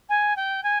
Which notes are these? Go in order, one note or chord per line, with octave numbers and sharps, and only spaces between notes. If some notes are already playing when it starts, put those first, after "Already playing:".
G#5
G5
G#5